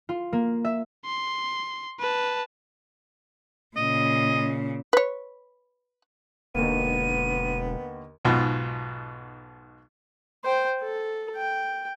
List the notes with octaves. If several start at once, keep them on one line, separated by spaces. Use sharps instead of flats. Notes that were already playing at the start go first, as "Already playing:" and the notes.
F4
A#3
E5
C6
B4 A5
A#2 C#3 D#5
B4 C#5
E1 D#2 D3 A#3 B3 D#7
B1 G#2 B2 F4
C5 G5
A4
G5